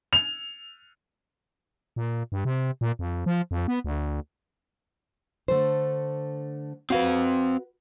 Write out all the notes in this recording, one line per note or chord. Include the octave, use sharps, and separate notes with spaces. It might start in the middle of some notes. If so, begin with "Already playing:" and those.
F7
A#2
G2
C3
A#2
F2
F3
F2
B3
D2
D3 A3 C5
C4 F#4 B4 F5